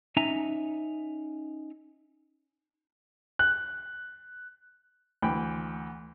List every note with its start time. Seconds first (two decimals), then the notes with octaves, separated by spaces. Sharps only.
0.17 C#4 D#4 E5 G#5 A#5
3.39 F#6
5.22 D2 E3 G5 B5